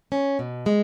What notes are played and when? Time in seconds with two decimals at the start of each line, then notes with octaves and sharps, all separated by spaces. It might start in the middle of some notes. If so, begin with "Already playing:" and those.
0.12 C#4
0.39 B2
0.66 G#3